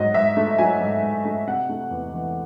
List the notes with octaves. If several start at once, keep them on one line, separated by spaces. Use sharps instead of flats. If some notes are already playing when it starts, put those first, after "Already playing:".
Already playing: G#2 F#3 D#5
G#2 E5
A3
F#3 G#5
G#2
G#2
A3
C3 F#5
A3
E2
E3